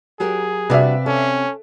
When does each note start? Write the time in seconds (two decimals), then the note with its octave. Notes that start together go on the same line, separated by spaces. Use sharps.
0.20 F#3 G4 G#4 A#4
0.70 C3 G3 D4 F#4 B4 D5 E5 F5
1.06 C#4 A4